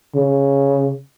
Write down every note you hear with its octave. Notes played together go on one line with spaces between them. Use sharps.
C#3